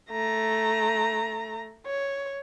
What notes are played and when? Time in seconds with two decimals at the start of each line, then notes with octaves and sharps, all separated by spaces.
0.11 A3 A#5
1.87 C#5